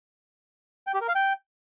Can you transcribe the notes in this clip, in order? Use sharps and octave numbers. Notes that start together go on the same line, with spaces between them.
G5
G4
A#4
F5
G5